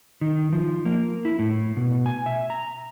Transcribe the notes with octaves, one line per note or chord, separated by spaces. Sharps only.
D#3
F3
A#3
E4
A2
B2
G#5
E5
A#5